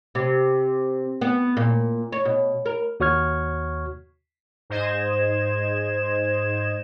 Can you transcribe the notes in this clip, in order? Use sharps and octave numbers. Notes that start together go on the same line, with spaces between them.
C3
B3
A#2
C#5
B2
A#4
D#2 F#4 C#5 C#6 F6 G#6
G#2 C5 D#5 G#6 E7